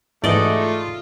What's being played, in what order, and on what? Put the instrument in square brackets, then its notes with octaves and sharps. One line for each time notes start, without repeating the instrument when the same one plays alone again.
[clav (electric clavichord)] G#2 E3 [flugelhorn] A3 [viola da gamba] D#4 F#4 G#4 [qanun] D5 D#5
[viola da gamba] F4